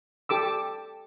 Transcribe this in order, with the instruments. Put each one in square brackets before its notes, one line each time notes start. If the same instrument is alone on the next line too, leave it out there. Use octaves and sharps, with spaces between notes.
[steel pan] G4 A4 D6 E6